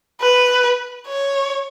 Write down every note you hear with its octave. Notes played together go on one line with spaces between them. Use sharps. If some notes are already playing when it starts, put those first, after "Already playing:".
B4
C#5